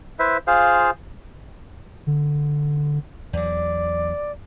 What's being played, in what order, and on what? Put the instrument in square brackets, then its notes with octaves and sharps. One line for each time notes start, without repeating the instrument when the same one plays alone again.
[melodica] E4 B4 C5 E5
F4 G#4 C5 F5
[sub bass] D3
[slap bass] E2 F#3 [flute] D5